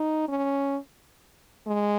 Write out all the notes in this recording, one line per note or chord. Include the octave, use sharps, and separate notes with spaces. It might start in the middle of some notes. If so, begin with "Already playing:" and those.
Already playing: D#4
C#4
G#3